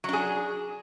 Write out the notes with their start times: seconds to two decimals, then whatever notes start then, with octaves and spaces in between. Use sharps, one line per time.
0.04 F#3
0.09 D4
0.13 G#4